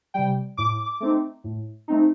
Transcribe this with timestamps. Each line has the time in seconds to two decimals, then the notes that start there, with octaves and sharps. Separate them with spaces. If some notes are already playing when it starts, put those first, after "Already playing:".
0.14 C3 G3 G5
0.57 A2 D6
1.00 A3 C4 D#4
1.44 A2
1.88 A3 C4 D#4